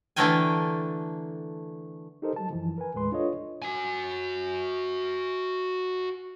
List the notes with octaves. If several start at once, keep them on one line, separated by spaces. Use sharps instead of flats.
D3 E3 A3 A#4 G5 G#5
D#4 G4 A4 A#4 C5 D#5
F#3 G3 A5
F#2 E3 F3
A#4 B4 G#5
D#2 A2 G#3 B4 C6
D4 F4 A4 C#5 D#5
F#4 G#5